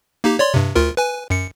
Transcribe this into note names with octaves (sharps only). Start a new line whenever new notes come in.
A#3 D#4 G4
C#5 D5 C6
G2 C3
D2 F4 A#4
B4 G#5
F#2 C#7